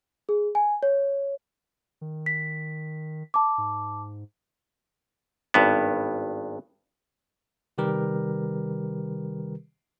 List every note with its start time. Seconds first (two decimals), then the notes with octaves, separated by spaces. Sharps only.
0.29 G#4
0.55 G#5
0.83 C#5
2.01 D#3
2.26 B6
3.34 A5 D6
3.58 G#2
5.54 G#1 G2 B3
7.78 C3 D#3 G3 G4 A#4 B4